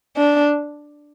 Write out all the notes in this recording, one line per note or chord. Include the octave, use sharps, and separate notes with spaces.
D4